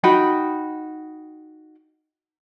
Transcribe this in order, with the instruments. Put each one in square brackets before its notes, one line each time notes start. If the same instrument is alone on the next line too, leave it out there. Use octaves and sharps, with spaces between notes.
[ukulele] D#4 F#4 G5 B5